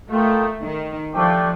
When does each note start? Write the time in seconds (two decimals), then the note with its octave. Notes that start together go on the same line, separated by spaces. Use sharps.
0.10 A3 F4 A#4 D#5 G5
0.62 D#3
1.13 F3 A3 D4 G4 D5 G5